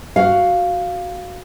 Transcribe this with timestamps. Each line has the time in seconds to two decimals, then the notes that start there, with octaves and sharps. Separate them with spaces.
0.16 F#4 F5